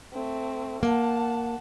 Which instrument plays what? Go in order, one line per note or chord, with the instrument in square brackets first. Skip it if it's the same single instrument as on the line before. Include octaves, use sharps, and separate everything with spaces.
[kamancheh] A3 C4
[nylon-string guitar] A#3 [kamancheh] F#5 A5